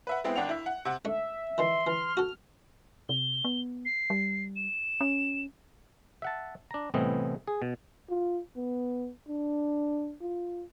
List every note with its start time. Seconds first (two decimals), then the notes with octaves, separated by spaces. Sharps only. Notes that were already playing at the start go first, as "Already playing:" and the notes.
0.07 B4 E5 F#5
0.24 G#3 B3 C4 E4 G5
0.36 G#1 D4 F#5 G5 F7
0.49 E4 E5
0.66 F#5
0.85 C3 F#5
1.05 A3 D4 E5
1.58 D#3 E3 C6
1.87 E3 F6
2.17 F#4 A4
3.09 C3 G7
3.44 B3
3.85 C7
4.10 G3
4.56 E7
5.01 C#4
6.22 E5 F#5 A5
6.71 D4 A#5
6.94 C2 A2 E3 B3 C4 D#5
7.47 G#4
7.62 B2
8.10 F4
8.56 B3
9.28 D4
10.21 F4